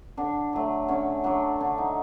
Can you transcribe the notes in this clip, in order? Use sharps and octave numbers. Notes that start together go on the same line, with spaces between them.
D3 D4
F#3 A3
D3 C#4
F#3 A3 D4
D3 D4
D#4